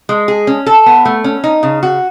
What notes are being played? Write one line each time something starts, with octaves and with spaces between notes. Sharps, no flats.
G#3
G#4
C#4
A4
B3
A3
C#4
D#4
C#3
F#4